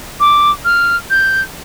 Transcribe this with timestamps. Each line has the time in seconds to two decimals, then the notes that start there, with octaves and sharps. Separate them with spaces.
0.20 D6
0.65 F6
1.10 G6